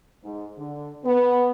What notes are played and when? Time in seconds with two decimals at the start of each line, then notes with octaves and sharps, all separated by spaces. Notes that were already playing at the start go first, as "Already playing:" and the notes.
0.24 G#2
0.58 D3
1.05 B3